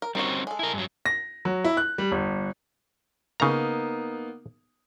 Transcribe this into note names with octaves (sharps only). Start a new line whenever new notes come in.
A#4
D#3 G3 C4 C#4 F#4
G#3 A4
E4 A#4
G2 F#3
A#6
F#3
E4
F#6
G3
G1
C#3 A#3 B3 D#4 A#5